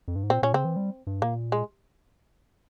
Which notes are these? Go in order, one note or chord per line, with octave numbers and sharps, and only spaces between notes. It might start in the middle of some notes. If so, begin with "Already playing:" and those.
F2
G2
G#2
A#2 C4
A#2 C#4
C#3 C4
E3
G3
G2
A#2 A#3
G#3